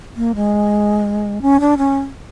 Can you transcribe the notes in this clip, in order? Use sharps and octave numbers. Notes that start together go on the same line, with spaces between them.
A#3
G#3
C#4
D4
C#4